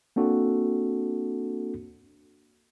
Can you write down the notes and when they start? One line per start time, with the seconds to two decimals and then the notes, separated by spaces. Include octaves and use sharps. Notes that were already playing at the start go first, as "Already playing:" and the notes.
0.16 A#3 C4 D4 F#4 A4